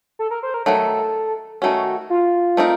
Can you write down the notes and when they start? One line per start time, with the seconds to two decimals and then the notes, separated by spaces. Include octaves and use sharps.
0.19 A4
0.31 A#4
0.43 C5
0.54 A#4
0.66 D#3 F#3 A3 A4
1.62 D#3 A3 C#4 F#4
2.10 F4
2.57 A3 C4 D#4 A#4